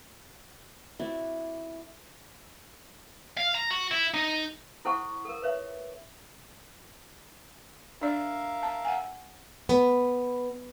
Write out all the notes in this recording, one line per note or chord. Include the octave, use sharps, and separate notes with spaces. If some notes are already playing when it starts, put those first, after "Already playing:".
C4 E4 F#4 D5
F5
A#5
F#4
E4
D#4
E4 A4 C5 F#5 G#5 C#6
A4 A#4
B4 C#5 E5
D4 A#4 D5 E5 F5
A5
F#5 G#5
B3